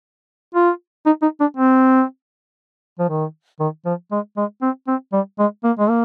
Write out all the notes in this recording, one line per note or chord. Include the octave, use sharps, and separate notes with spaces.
F4
D#4
D#4
D4
C4
F3
D#3
D#3
F3
G#3
G#3
C4
C4
G3
G#3
A#3
G#3
A#3